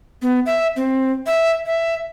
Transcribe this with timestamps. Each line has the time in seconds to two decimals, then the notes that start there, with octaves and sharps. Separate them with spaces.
0.22 B3
0.46 E5
0.76 C4
1.27 E5
1.66 E5